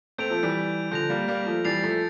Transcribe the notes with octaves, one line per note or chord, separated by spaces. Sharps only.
A3 C4 G6 D7 F7
F3 A3
E3 G3
D3 F3 G6 A#6 F7
G3 A#3
G3 A#3
F3 A3
E3 G3 A6 C7 F7
F3 A3